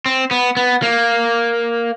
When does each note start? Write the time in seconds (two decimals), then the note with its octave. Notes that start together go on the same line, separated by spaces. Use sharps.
0.06 C4
0.31 B3
0.57 B3
0.82 A#3